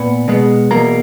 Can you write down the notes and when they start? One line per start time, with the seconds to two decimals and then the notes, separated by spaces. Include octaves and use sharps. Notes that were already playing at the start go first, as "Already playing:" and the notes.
Already playing: A#2 B3 B5
0.28 B2 G#3 B3
0.71 E2 B2 A#3 A#5